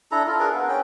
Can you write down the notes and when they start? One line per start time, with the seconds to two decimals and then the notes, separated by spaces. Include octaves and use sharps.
0.12 D4 E4 A4 A#5
0.27 F4 A4
0.39 D4 G#4 A#4 B4
0.54 B3 B4
0.68 C#4 G5